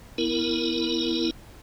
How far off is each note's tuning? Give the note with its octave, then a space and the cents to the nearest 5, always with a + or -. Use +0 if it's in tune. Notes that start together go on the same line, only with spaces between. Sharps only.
B3 +0 E4 +0 A#4 +0